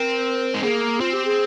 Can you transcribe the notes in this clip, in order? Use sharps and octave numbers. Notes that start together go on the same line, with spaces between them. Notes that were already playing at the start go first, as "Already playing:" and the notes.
Already playing: C4 A#4
G#3
A#3 G#4
C4 F4
G4
G#4